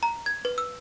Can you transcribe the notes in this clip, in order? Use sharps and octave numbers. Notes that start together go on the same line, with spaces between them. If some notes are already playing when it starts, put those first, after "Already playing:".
A#5
G#6
B4
E6